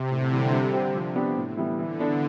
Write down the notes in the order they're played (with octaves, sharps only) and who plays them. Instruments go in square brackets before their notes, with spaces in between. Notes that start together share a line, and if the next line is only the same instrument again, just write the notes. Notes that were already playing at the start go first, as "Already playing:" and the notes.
Already playing: [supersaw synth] C3
[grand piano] A2 [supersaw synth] D3
[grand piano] E3 G3
G3
C4 G4
F3
B3 D4 G4
A2
E3 G3 B3
[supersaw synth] D3 [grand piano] E3
[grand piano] B3 D4 A4